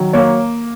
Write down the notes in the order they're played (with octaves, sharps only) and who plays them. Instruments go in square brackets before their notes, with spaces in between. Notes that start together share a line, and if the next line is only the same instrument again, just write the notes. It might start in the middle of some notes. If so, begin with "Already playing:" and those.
Already playing: [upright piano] D#3 F#3
A#3 C#5